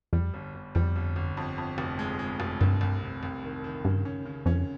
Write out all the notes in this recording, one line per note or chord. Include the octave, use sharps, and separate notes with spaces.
F2 G3
G1
G1
F2 G3
G1
G1
F2
F2
F1
G#3
G#3
F1
C2 G2
C2
C3
C2
D#3
D#3
G2 C#3
C#4
C#3
F2 C#4